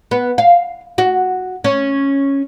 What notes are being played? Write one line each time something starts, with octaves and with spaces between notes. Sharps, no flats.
B3
F5
F#4
C#4